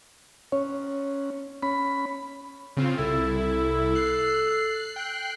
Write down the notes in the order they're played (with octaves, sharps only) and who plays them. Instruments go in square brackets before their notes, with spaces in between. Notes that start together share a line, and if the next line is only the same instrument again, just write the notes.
[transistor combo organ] C#4 [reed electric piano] C#5
[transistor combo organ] C#4 B5
[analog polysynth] C#3 C4 F4
[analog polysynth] C2 E4 [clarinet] A4
[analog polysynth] F#6 C7
G5 F#6 C7